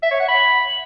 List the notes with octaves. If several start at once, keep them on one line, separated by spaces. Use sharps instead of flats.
E5
C#5
F#5
B5